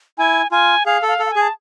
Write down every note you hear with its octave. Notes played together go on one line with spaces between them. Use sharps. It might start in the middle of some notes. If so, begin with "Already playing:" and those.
E4 G#5
F4 G#5
G#4 F5
A4
F5
A4
F5
G#5
G#4
A5